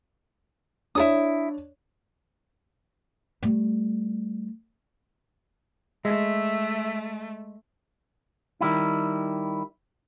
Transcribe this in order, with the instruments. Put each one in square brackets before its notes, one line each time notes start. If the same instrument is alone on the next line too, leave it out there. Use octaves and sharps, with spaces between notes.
[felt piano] D4 C#5 [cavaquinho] E4 A4 D#6
[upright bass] G3 A3
[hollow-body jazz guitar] G#3 [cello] A3 [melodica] E5
[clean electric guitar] D#3 G3 E4